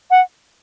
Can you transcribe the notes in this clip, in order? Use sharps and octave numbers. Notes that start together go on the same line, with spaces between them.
F#5